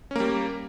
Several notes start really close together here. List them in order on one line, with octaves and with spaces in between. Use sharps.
C#4 A#3 G3